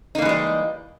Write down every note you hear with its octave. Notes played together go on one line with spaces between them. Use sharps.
E3 G3 G#3 A#3 D#4